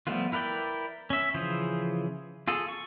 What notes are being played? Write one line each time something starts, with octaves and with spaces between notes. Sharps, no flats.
F3 G3 A3 B3 F4
E4 A#4 B4 D5 G5
C#4 E5
C#3 E3 F3 G#4 C5
F4 G#4 A4
C#6